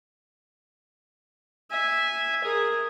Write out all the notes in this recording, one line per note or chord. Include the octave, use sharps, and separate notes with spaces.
E5 G#5
G#4 A#4